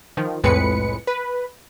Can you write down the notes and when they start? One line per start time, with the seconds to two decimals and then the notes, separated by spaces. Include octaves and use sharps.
0.17 D#3 F3
0.44 C2 F2 A2 G#3 B4 C#7
1.07 B4